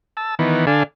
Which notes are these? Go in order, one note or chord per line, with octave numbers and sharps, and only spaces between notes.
A5 E6
D#3 E3 B3
D3 D4 A4 F5 G#5